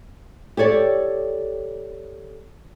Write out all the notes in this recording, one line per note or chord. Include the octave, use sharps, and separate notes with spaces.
G4 A4 C#5 D5